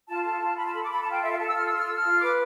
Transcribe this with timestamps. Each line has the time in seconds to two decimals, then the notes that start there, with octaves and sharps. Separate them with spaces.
0.08 F4 A5
0.25 A4 A5
0.42 F4
0.57 F4 B5
0.66 A5
0.74 A4 B5
0.82 D6
0.90 A4 B5
1.02 A5
1.07 F4 G5
1.22 A4 E5
1.31 F5
1.39 A4 A5
1.47 E6
1.55 F4 F6
1.66 E6
1.72 F4
1.78 F6
1.86 A4 E6
1.95 F6
2.04 F4
2.20 B4 D6